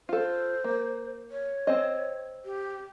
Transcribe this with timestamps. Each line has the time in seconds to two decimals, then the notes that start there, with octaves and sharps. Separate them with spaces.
0.09 F4 A4 C5
0.64 A#3
1.31 C#5
1.67 C4 C5 D#5
2.45 G4